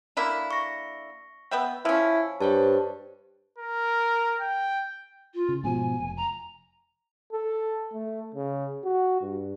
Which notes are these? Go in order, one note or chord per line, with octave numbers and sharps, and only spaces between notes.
D3 A#3 E4
C#6 A#6
B3 E5 G5
F3 C#4 E4
G2 C5 C#5 A5
A#4
G5
F4
C#3
G#2 B2 F3 G#5
F1
A#5
A4
A3
C#3
F#4
G2